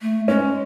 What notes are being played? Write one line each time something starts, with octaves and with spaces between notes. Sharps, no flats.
A3
G#3 C#4